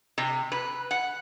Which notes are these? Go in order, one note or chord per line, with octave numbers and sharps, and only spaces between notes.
C3
B4
F#5